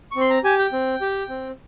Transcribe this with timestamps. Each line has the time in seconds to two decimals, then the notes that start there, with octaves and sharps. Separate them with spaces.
0.11 C#6
0.16 C4
0.21 C6
0.30 A#5
0.44 G4 G#5
0.59 G5
0.72 C4
1.01 G4
1.29 C4